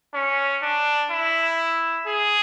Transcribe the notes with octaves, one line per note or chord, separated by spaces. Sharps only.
C#4
D4
E4
G#4